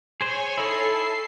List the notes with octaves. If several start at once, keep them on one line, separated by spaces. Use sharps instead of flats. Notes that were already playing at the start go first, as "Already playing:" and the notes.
G#4 C5 C#5 G#5 C#6
D#4 E4 A4 C7